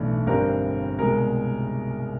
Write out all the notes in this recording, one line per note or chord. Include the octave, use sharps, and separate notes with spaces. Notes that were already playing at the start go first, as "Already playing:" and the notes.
Already playing: B1 A2 E3 A3 D4
G1 G2 D3 G3 C4 A#4
C2 B2 G#3 A#4